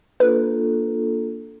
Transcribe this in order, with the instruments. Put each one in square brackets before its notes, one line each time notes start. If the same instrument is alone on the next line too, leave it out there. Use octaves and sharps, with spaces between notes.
[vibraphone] A#3 D4 F4 A4 [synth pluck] B4